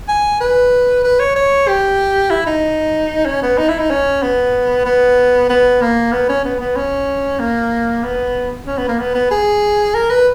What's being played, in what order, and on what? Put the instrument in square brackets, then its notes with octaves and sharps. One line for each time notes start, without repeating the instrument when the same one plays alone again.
[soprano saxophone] G#5
B4
B4
C#5
C#5
G4
E4
D#4
C#4
B3
D#4
E4
D#4
C#4
B3
B3
B3
A#3
B3
C#4
B3
B3
C#4
A#3
B3
C#4
B3
A#3
B3
B3
G#4
A#4
B4